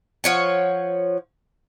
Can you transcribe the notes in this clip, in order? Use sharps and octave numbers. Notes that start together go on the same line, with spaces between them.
F3 C#5 F#5